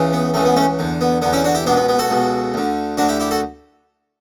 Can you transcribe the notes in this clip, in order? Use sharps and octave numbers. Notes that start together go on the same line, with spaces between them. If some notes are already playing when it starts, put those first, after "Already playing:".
Already playing: C#2 C#3 E3
B3
C#2 C#3 E3 A3
B3
A3 C#4
E2 D3
B3
E2 D3 B3
C#4 E4
D4 F#4
E4 G4
C#2 B2 B3 D4
B3
B3
F#4 A4
C#2 B2
D2 D3
D2 D3 D4 F#4
E4 G4
E4 G4
F#4 A4